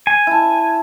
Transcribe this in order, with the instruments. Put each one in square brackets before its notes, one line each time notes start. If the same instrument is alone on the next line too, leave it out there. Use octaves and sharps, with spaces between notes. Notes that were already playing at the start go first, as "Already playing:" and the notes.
[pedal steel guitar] G#5
[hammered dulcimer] E4 A5